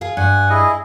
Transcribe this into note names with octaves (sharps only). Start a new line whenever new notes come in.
F4 G#4 F5
G2 F#5 G#5
E4 G#4 D#5